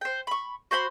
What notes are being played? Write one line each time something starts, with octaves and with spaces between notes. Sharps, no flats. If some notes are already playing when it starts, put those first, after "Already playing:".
C5 G5
B5 C#6
F#4 C5 B5 C6